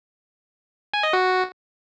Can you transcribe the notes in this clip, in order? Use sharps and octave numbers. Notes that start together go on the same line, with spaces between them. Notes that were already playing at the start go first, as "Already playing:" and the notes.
G#5
D#5
F#4